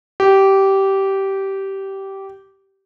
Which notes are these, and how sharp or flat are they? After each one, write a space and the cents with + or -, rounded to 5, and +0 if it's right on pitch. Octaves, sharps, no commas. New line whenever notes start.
G4 -15